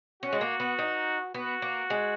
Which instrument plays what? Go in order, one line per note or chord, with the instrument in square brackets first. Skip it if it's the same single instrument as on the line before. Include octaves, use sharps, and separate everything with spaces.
[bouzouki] C#4 [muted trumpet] F#4
[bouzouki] G#3
A#3
B3
D#4
[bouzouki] B3 [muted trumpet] F#4
[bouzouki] A#3
G#3